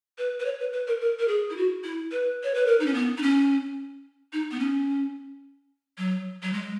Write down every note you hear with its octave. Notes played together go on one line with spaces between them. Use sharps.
B4
B4
C#5
B4
B4
A#4
A#4
A#4
G#4
E4
F#4
E4
B4
C#5
B4
A#4
D#4
C#4
B3
D#4
C#4
D#4
B3
C#4
F#3
F#3
G#3